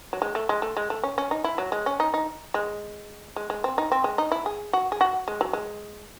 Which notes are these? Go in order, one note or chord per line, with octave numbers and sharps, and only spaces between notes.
F#3
G#3
A3
G#3
A3
G#3
A3
C#4
C#4
D#4
E4
F#3
G#3
C#4
D#4
D#4
G#3
G#3
G#3
C4
D#4
C4
G#3
D#4
E4
G#4
F#4
G#4
F#4
G#3
F#3
G#3